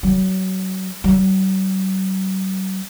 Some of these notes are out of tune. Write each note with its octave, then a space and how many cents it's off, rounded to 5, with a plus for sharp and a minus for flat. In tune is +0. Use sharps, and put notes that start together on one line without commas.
F#3 +25
F#3 +45